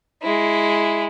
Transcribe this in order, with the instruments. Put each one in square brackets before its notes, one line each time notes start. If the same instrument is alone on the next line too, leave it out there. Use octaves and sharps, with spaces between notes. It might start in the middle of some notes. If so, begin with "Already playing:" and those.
[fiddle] G#3 E4